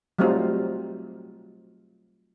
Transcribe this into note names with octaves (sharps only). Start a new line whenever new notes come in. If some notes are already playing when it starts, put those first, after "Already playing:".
F#3 G3 A3 C4 D#4 F4